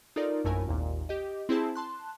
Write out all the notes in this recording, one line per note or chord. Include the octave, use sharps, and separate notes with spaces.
D#4 F4 A4 A#4 D5
A#1 F#2 A3 E4 A#4 G#5
G#1 D#2 A#2
G4 D#5
C4 E4 G#4 C5 A5
A5 C6 F#6